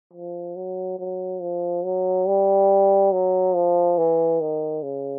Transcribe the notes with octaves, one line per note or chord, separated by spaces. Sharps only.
F3
F#3
F#3
F3
F#3
G3
F#3
F3
E3
D#3
C#3